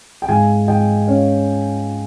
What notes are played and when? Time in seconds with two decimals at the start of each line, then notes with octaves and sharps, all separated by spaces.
0.22 G5
0.28 G#2 F5 G#5
0.67 G#2 D#5 G5
1.07 C#4 C#5 F5